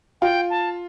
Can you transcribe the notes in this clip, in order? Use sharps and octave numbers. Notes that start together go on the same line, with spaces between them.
F4 G5
A5